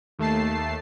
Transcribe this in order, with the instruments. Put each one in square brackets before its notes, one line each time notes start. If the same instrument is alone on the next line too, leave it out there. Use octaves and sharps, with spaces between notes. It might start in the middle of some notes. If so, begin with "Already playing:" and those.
[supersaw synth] D#2 A3 A5 C7